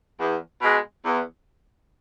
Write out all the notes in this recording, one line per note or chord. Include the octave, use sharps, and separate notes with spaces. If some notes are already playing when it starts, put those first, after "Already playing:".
E2
B2 G#3
E2